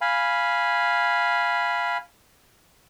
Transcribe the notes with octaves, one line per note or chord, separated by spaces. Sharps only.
F5 G#5 B5